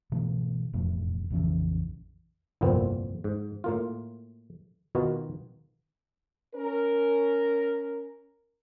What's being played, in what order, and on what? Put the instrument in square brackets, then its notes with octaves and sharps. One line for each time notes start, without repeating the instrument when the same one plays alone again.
[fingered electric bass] B2 D3 E3 A3
E1 F2 A2
A#1 F2 C#3 E3
[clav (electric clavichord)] G1 C2 F2 A#2 B3 C4
G#2
A2 A#3 F4
B2 D#3 B3 D#4 F4 F#4
[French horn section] C#4 A#4